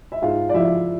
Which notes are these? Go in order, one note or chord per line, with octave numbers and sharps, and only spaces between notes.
E5
G#2 F4 F5
D5
F3 E4 E5